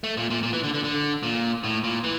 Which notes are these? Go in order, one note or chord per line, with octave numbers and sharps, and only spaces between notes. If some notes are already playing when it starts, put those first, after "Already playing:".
A3
A#2
A#2
A#2
E3
D3
D3
D3
A#2
A2
A#2
E3